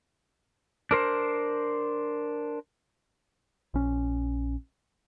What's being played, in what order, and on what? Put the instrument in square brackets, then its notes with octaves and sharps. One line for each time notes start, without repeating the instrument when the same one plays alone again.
[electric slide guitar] D4 A#4 C5
[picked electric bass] A#1 C#4